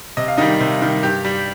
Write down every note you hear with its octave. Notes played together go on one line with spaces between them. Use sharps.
C3 D#5
F5
D#3 G3 D#4 D#5
C3
D#3 G3
G2 G4
G3